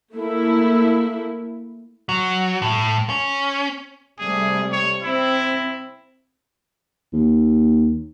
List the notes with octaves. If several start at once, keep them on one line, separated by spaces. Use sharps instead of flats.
A3 A#3 E4
F#3
A2
C#4
C3 G3 A3 G#4
C#5
C4 E4
D#2